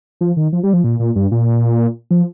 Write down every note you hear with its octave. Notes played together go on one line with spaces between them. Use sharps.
F3
D#3
F3
G3
F3
A#2
A#2
G2
A#2
F3